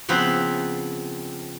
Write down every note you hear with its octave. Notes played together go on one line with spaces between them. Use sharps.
C#3 F3 B3 C4 B4